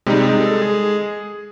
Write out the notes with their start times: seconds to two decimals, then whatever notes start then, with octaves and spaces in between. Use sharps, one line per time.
0.07 C3 G3 G#3 D#4
0.40 A4
0.62 G#4